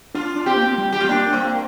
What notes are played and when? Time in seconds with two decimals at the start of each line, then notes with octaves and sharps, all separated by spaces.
0.15 D4 F4
0.36 D4
0.46 C4 G4
0.57 A#3
0.67 C4
0.74 A#3
0.78 G3
0.93 G4
1.00 F4
1.04 C4
1.09 A#3 D4
1.33 C4